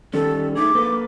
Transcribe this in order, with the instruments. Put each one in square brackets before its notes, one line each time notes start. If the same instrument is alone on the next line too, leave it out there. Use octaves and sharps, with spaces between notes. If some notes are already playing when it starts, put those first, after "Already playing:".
[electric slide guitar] D#3 G3 C#4 [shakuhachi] A4
[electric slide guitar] A3 D#4 G#4 [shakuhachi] D6
[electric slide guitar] A#3 A4 B4